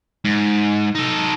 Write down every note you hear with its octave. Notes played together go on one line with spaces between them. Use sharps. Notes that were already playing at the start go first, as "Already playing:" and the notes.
G#2
D#4 A4